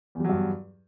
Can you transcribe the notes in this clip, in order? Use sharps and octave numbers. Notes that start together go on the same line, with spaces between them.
E2 G2 F#3 G3